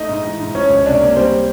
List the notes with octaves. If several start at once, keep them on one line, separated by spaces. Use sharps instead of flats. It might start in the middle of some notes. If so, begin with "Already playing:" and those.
Already playing: A3 D#4 D#5
G#2
E3
G#2
F3 C#4 C#5
C#2
C3 D4 D5
A#3
G3 C4 C5